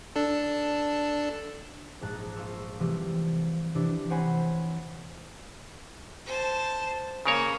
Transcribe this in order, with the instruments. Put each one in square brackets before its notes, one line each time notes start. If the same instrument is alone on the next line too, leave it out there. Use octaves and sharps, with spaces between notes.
[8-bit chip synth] D4 A4
[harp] A#1 G#2 A5 F#6
F4 C5 C#6 E6
C3 E3 F3 G3 A3
C3 E3 D4 E4 A4
C4 C5 C#5 F#5 G#5 B5
[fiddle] C5 A5
[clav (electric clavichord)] C#3 A#4 C#5 [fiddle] A#3